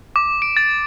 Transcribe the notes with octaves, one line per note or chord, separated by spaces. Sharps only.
D6
D7
A6